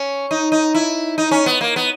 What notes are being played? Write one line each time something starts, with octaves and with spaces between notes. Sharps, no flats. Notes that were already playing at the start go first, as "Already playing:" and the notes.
Already playing: C#4
D#4
D#4
E4
D#4
C#4
B3
A#3
B3